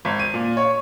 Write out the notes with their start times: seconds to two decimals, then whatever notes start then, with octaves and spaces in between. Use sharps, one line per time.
0.05 G#1
0.19 D#7
0.34 A#2
0.57 C#5